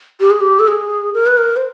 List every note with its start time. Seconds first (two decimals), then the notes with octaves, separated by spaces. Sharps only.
0.20 G4
0.30 G#4
0.41 G4
0.60 A4
0.68 G#4
1.14 A#4
1.27 B4
1.38 A#4
1.56 C5